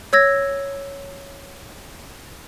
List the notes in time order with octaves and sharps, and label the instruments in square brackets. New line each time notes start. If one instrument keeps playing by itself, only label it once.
[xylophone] C#5 E6 G#6 A#6